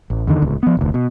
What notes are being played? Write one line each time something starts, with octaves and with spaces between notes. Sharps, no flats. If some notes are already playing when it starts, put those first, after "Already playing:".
A1
E2 D3 D#3
D1 C#2
F3 B3
F1 D2
B2